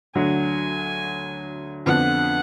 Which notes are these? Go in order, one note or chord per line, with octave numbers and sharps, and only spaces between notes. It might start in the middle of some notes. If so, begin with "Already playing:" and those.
D2 D3 F#3 D4 G#5
F2 D3 F3 B3 D4 F#5